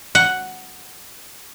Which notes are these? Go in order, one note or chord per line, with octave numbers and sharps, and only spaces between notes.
F#5